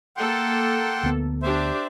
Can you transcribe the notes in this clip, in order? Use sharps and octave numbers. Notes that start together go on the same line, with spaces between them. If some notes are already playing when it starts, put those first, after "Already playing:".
A#3 A4 F#5 G5 C6
D2 B3
D4 G4 C5 E5